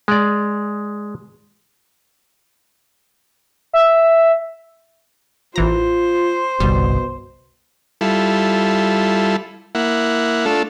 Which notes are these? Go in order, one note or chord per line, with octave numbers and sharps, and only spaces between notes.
G#3 D5
E5
A1 E3 F4 C5 A#5
G1 C2 B2 G3
G3 E4 F4 A4
A#3 E4 F#5
A3 D4 F4 A4